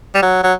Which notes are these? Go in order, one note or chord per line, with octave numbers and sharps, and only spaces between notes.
G3
F#3
F#3